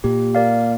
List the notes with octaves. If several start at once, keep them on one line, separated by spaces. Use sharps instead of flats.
A#2 G4
A#4 D5 F5